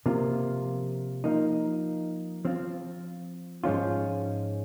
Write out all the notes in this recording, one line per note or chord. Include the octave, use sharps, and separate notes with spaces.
C3 F3 A#3 F4
F3 A#3 D#4
F3 C4 F4
G#2 F3 G#3 C#4 F4